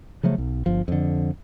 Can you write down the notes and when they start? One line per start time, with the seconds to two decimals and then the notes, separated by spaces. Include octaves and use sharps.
0.23 C#3 F3 F#3 A3
0.38 B1
0.66 G1 F3
0.88 F2 D3